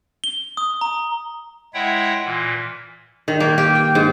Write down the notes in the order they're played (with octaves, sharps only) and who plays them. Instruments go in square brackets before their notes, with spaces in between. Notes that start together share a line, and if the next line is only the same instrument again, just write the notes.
[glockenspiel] G7
D#6
A#5
[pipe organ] G#3 E4 C#5 E5 F#5 G5
A#2 E3
[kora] D#3
A#3
G4
G5
G#2